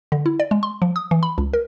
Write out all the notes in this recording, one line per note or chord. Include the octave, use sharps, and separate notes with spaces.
D3
E4
D5
G#3
C6
F3
D#6
E3
B5
C#2
A#4